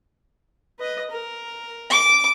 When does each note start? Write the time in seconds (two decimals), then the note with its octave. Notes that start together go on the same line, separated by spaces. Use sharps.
0.79 B4 D#5
1.11 A#4
1.90 D6